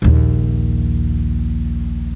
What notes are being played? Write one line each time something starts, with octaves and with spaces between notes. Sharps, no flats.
A#1 D#2